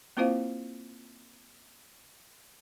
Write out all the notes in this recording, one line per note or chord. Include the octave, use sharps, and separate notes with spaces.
A#3 C4 E4 F4 C5 F5